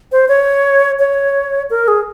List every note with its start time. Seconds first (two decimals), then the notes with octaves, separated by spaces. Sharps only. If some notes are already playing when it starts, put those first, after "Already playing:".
0.12 C5
0.28 C#5
0.99 C#5
1.70 A#4
1.88 G#4